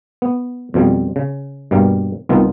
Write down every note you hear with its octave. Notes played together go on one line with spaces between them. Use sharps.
B3
F2 B2 F3 G3
C#3
G2 B2 G3 A#3 F5
C2 D#3 B3 F4